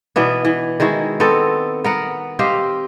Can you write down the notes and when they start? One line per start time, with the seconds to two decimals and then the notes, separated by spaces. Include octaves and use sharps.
0.16 B2 E3 B3 D4
0.45 E3
0.80 D#3 G#3 E4 F#4
1.20 B3 C4 F#4 A4
1.84 B3 A#4 F#5
2.39 C4 G4 D#5 F5